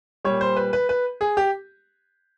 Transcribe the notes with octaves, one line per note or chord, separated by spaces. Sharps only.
A#2 G3 C#5
C5
B4
B4
B4
G#4
G4